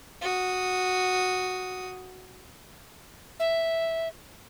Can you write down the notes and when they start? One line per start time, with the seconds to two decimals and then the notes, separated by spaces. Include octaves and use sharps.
0.21 F#4 D#6
3.40 E5